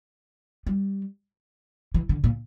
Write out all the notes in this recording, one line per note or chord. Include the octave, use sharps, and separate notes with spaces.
G3
E3
D3
A#2